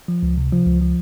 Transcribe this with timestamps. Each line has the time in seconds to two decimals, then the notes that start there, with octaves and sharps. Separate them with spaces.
0.08 F3
0.23 C#2
0.37 C3
0.52 F3
0.66 C#2
0.82 F3